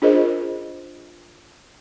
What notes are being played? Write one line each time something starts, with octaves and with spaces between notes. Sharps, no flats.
D4 F4 G#4 A#4 C5 D#5